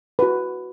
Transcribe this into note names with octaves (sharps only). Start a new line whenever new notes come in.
F#4 B4